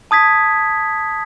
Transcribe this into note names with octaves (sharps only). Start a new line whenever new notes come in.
A5 D#6 G#6 B6